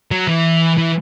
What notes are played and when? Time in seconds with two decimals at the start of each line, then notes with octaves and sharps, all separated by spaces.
0.11 F#3
0.27 E3
0.77 E3